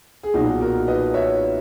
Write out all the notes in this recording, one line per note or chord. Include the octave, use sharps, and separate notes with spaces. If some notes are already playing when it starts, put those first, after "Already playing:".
G#4
B1 A#2 D#4 F#4
F#4 A#4
B4 D#5
C#5 E5